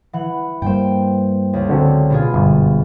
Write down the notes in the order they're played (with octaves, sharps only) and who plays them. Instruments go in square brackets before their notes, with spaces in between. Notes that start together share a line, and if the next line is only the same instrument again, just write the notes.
[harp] E3 F#5
[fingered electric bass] G2 G3 A#3 [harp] C5 G5
[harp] C#2
[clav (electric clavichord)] D3 F#3 C4
[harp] B2 F4 G#4
[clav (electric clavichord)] G1 [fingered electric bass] F#2